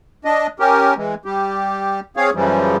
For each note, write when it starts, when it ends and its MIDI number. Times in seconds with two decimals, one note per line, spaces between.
0.25 0.47 62
0.25 0.47 75
0.60 0.94 61
0.60 0.94 67
0.60 0.94 70
0.97 1.15 52
0.97 1.15 56
1.25 2.00 55
1.25 2.00 67
2.17 2.30 60
2.17 2.30 68
2.17 2.30 73
2.17 2.30 77
2.35 2.77 42
2.35 2.77 49
2.35 2.77 52
2.35 2.77 53
2.35 2.77 55